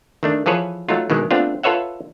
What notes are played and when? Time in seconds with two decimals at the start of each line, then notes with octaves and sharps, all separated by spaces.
0.23 D#3 A3 D4
0.46 E3 F3 G#4 A4 B4 C#5
0.89 F#3 A3 D#4 F4
1.10 B2 D#3 E3 G#3
1.31 A3 B3 C4 D4 F4
1.63 F4 A4 B4 C#5 E5 F#5